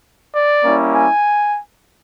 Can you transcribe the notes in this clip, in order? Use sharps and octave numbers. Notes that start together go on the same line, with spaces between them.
D5
G3 A#3 C#4 E4
G#5